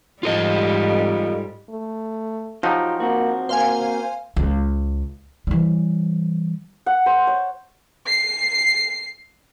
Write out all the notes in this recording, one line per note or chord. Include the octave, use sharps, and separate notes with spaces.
G#2 G3 F4 A4 D#5
A3
F3 F#3 D#4 F4 G4
A#3 C4 F#4
A#3 C5 F5 G#5
C#2
E3 G3
F#5
C5
C#5
C7